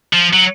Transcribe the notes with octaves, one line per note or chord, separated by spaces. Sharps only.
F3
F#3